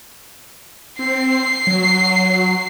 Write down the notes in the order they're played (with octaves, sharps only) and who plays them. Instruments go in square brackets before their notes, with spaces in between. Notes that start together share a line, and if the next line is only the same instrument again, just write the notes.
[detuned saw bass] C4 [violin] C7
[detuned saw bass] F#3